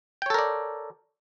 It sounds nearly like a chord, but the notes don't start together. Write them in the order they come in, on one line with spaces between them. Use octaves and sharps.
G5 C#5 A4 A#4 D5